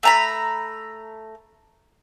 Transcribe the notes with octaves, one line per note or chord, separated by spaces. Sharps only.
A3 A#5 B5